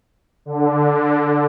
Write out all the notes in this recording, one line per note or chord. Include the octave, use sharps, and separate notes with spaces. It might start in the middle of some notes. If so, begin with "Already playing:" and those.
D3